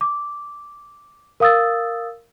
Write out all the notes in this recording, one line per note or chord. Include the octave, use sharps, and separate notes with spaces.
D6
A#4 F5 D#6 E6 A6